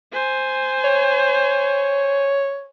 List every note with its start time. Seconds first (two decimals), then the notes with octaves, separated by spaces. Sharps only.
0.12 C5 G#5
0.85 C#5